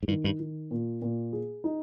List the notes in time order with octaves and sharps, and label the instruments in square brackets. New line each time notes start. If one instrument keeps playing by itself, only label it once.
[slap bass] G#2
[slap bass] G2 [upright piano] D#3
[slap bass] G2
[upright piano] D#3
A#2
A#2
G#4
D#4